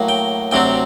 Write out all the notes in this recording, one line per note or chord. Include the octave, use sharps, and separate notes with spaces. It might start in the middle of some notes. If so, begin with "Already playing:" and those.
Already playing: A2 F#3 A#3
G5
D2 C3 F#3 C4 G5